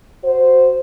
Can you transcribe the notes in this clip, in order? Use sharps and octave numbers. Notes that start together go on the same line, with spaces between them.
F#4 C5